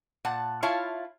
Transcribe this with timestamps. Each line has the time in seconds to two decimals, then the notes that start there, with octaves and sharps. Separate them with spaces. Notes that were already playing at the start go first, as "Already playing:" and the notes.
0.25 A#2 F#5 A5
0.63 E4 F4 C#5 F5 A5